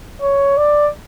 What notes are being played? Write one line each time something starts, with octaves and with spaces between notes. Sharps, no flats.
C#5
D5